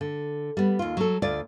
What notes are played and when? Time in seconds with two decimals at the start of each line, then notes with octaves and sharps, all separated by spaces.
0.01 D3
0.57 G3 B3
0.79 D#2 F4
0.97 F#3 A4
1.22 D2 F4 D5